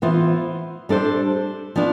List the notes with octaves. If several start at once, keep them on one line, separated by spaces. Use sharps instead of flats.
E3 B3 F4 C5
G3 D4 A4 C5
F3 B3 D4